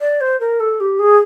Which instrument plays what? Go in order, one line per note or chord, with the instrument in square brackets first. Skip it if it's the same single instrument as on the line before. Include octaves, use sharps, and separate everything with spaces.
[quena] D5
C5
A#4
A4
G4
G#4